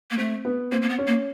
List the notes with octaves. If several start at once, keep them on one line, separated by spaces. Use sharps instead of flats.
A#3
A3 C4
B3
A#3 C4
A#3
B3
C#4
A#3